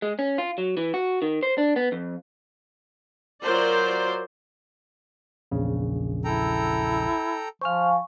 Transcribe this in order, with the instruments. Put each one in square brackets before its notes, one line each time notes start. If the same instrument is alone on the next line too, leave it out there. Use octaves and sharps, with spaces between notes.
[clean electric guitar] G#3
C#4
F4
F#3
E3
F#4
D#3
C5
D4
B3
F2
[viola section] F#3 F4 A#4 C5 D5
[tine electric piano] A#1 E2 C#3
[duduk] E4 [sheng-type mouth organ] A4 G5 A#5
[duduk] F3 [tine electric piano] C5 F6 [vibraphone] F5 G#5 C#6